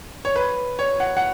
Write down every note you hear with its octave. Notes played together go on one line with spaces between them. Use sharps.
C#5
B4
C#5
F#5
F#5